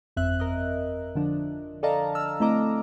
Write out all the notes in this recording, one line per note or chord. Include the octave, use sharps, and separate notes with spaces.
G1 F2 C4 E5 F#6
A#4 D#5
D3 F3 D4
A4 D5 D#5 F5 A5 A#5
E6 F6
A3 C4 E4 D#5 A#5 D6